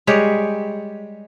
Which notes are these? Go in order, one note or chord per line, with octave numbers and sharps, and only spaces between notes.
G3 G#3 G4 C#5